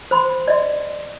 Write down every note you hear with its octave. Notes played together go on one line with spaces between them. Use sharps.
C5 B5 C6
D5 D#5 C6